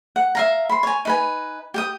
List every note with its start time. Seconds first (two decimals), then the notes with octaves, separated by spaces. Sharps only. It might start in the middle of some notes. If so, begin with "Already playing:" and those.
0.16 F#5
0.35 E5 F5 A#5
0.69 B5 C6
0.83 C#5 G#5
1.05 D#4 B4 G#5
1.74 G4 G5 D#6